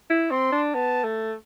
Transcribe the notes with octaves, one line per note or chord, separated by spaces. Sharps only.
E4
C4 C6
D4
B3 A5
A3